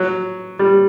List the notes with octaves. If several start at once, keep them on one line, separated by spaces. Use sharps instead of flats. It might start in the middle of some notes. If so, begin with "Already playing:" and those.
Already playing: F#3
G3